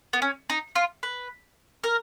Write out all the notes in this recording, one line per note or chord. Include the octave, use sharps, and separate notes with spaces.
B3
C#4
D#4
F4
B4
A#4